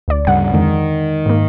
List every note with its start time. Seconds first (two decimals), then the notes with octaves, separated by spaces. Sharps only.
0.08 D2 D5
0.27 G2 C#3 G3 F#5
0.54 F2 D3 D#3 G#3
1.26 G#2 A#3